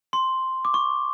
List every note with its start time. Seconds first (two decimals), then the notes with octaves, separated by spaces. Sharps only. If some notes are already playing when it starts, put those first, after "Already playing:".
0.13 C6
0.65 D6
0.74 C#6